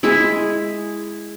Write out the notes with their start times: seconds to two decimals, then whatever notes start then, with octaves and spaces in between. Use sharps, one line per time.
0.03 G#3 E4 G#4 E5